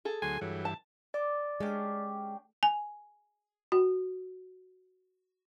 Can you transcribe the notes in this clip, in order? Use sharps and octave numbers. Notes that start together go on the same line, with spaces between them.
G#4 A4
D2 F#3 G#5 C6
G2 E3 F#3
A5
D5 D6
G#3 C#4 D4 G4
G#5
F#4